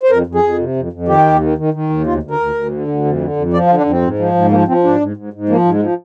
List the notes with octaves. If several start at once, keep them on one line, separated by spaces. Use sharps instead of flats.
C5
F2 A#4
F2
G#4
F2
C3
F2
F2
D#3 G4
D#2
D#3
D#3
D#3
D#2
D2 F4
D2
A#4
D2
D2
D3
D2
F2
D3
F2
F3 D5
F4
D3
D4
F2 C4
G#2
F3
G#2
F3 A#3
F3 C4
G#2 D4
G#2
G#2
G#2
F3 A#3
G#2
G#3
F3